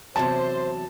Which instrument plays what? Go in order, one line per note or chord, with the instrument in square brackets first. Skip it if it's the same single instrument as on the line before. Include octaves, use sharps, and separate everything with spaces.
[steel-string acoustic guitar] E2 C3 F#3 [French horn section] C5 [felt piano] A5